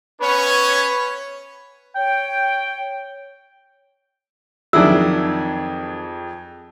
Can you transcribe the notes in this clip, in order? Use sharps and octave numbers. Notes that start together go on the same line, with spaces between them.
B3 C#4 B4 C#5
C#5 G5
F2 D#3 F#3 D4 E4 G#4 E6